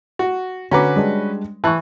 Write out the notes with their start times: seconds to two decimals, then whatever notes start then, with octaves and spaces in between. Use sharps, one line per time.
0.19 F#4
0.71 D3 C#4 F#4 B4 A#5 D6
0.96 G3 G#3 D4
1.64 E3 A5 C#6 F#6